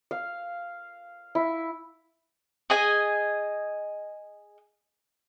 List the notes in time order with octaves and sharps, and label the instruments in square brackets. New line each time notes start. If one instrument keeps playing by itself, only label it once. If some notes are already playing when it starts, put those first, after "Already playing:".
[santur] F5
E4
[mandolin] G#4 D#5 G#5